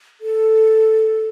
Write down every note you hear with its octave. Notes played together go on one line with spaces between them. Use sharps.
A4